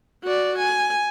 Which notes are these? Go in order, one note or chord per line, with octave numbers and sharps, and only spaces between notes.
F#4 D5
G#5